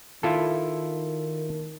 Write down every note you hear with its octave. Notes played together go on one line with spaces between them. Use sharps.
D#3 E4 F4 A4